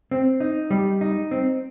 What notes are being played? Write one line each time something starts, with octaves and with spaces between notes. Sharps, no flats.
C4
D#4
G3
D#4
C4